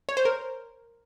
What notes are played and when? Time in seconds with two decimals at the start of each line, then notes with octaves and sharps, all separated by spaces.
0.09 C#5
0.17 C5
0.25 A#4